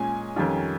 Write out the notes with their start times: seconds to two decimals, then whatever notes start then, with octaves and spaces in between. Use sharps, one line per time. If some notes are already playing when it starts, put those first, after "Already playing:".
Already playing: A#2 G#3 C#4 G#5
0.36 F2 D#3 G3 C#4 F4